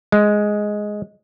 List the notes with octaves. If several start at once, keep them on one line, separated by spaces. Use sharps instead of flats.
G#3